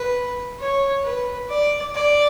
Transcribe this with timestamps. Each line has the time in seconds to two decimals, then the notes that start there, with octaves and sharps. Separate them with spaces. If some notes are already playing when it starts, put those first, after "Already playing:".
Already playing: B4
0.59 C#5
1.03 B4
1.49 D5
1.94 D5